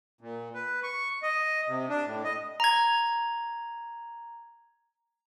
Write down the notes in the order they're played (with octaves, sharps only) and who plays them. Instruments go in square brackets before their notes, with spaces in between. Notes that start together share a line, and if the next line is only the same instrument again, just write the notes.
[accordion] A#2
B4
C#6
D#5
C3
D4
A2
D#5
[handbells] A#5 G#6